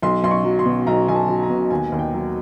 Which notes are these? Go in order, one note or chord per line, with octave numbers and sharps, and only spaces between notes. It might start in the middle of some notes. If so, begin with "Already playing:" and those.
B1 C6
B1 C6
C#6
F#3
C6
B2
B1 A#5
B1 G#5
A5
F#3
A#5
B2
D#2 G#5
D#2
G5
F#3